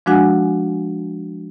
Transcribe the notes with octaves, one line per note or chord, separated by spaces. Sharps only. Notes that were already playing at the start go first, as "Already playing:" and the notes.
F3 G#3 D4 F#4 F#5 G#5